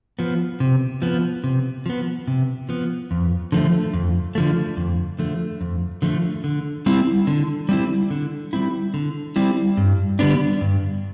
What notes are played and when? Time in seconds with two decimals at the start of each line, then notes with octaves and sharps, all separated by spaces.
0.19 F3 B3
0.60 C3
1.02 F3 B3
1.44 C3
1.86 F3 B3
2.27 C3
2.69 F3 B3
3.11 F2
3.52 D3 F3 A3
3.94 F2
4.35 D3 F3 A3
4.77 F2
5.19 D3 F3 A3
5.61 F2
6.02 D3 F3 A3
6.44 D3
6.86 G3 C4 E4
7.27 D3
7.69 G3 C4 E4
8.11 D3
8.53 G3 C4 E4
8.94 D3
9.36 G3 C4 E4
9.77 G2
10.19 D3 G3 B3 D4
10.61 G2